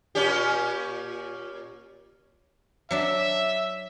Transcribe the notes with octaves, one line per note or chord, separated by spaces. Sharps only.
A#2 C#4 G4
F#3 D4 E5 A5